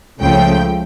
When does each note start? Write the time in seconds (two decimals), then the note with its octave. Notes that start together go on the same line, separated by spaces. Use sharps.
0.21 C#2 C#3 F3 A3 G5